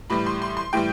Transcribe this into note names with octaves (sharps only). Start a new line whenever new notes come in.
A2 E3 G3 B5
C6
C6
C6
A2 E3 G3 G5